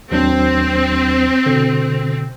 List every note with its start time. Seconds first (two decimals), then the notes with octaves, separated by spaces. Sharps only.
0.12 D#2 F#3 C4 D4
1.46 B2 D3